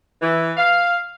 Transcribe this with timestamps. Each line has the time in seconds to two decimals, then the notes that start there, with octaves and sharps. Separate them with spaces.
0.22 E3
0.57 F5